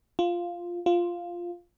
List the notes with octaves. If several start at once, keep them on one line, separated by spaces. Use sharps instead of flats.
F4
F4